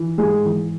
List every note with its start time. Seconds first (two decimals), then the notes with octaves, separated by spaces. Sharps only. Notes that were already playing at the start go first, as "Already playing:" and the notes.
Already playing: E3
0.18 G#2 G#4
0.45 E3